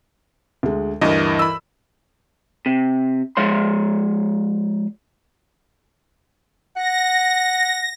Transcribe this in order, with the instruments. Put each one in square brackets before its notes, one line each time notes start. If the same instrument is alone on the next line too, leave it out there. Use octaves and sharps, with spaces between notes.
[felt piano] D2 G#3
[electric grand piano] D2 G2 D#5 [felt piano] E3 A#4
[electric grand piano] B5 E6
[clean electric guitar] C3
F3 G#3 C#5 C6
[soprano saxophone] F#5 [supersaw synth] A#6